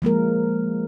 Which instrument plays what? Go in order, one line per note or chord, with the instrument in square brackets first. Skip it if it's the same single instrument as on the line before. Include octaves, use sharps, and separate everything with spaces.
[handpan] F3 G#3 A#3 A#4